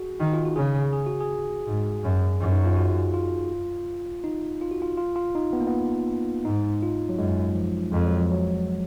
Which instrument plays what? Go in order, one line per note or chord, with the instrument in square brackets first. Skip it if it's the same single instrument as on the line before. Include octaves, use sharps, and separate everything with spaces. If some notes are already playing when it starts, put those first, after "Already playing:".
Already playing: [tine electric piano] F#4 G#4
[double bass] D#3 [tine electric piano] D#4
[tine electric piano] F4
F#4
[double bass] C#3 [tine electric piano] G#4
[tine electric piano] G#4
F#4
G#4
[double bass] G#2
F#2
F#2
[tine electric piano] D#4
F4
F#4
F4
D#4
F4
F#4
F4
F4
F4
D#4
B3
A#3
B3
[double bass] G#2 [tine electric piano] D#4
[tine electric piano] F4
F#3
[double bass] F#2 [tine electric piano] G#3
[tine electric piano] F3
[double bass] F2 [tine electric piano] G#3
[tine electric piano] F#3
F3
F#3